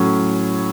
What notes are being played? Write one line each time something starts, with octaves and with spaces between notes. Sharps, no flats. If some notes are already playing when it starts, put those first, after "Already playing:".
Already playing: A2 F#3 C#4